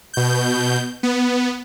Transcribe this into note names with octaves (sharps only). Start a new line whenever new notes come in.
B2 G6
B3